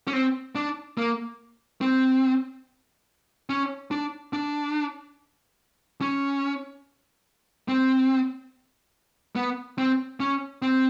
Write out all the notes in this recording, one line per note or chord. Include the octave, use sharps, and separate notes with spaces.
C#4
C4
D4
A#3
C4
C#4
D4
D4
C#4
C4
B3
C4
C#4
C4